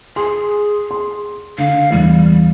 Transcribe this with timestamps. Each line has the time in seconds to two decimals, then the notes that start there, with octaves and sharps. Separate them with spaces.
0.16 G#4 G#5 C6
0.91 C6
1.58 D3 F5
1.92 E2 G3